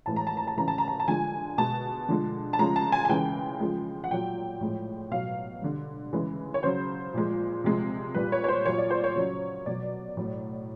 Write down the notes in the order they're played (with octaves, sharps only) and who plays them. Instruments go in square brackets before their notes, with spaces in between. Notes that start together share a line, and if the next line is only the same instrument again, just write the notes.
[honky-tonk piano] A2 E3 G#3 A5
A#5
A5
A#5
A5
C#3 E3 G#3 A#5
A5
A#5
A5
A5
D3 F3 G#3 G#5
B2 G#3 A5
D3 F3 G#3
A5
C#3 F3 G#3 A#5
A5
G#5
G#5
C#3 E3 G#3 G5
C#3 F3 G#3
F#5
A#2 F#3 G5
A2 F3 G#3
B2 F#3 F5
D3 G3
C#3 E3 G#3
C#5
C#3 F#3 C5
A#2 F3 G#3
C3 F3 G#3
A#2 G3 B4
C#5
C#5
C5
A#2 F#3 C#5
D5
C5
C#5
C#3 F#3
B2 F#3 D5
A2 F#3